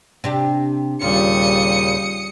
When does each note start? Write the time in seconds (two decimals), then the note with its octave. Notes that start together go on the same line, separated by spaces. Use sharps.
0.24 C3 D4 G4
1.01 D#2 A#2 C#3 G3 F4 D#6 C#7